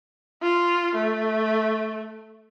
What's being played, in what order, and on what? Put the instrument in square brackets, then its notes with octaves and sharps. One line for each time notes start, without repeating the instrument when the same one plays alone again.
[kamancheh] F4
A3